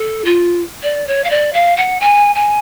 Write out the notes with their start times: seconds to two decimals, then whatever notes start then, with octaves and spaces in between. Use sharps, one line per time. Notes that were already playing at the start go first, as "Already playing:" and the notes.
Already playing: A4
0.24 F4
0.82 D5
1.06 C#5
1.23 F5
1.30 D5
1.52 F5
1.76 F#5
2.00 G#5
2.34 G#5